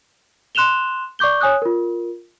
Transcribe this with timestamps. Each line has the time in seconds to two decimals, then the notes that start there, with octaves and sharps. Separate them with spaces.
0.55 C6 F#6 E7 F7 G7
1.19 D5 C#6 D6 G6 G7
1.41 C#5 G#5 D#6 F#6
1.62 F4 A#4